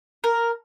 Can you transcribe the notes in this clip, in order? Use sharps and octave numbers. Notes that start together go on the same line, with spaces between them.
A#4